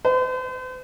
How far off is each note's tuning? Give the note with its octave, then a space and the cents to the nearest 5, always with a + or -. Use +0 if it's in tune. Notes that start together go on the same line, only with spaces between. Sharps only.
C5 -45